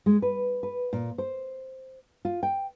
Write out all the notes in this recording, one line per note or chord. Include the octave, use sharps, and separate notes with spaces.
G#3
B4
B4
A#2
C5
F4
G5